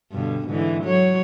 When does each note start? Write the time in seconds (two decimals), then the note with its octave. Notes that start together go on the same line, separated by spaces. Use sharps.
0.12 G2 B2 D3
0.48 G#2 D3 E3
0.85 F#3 C#5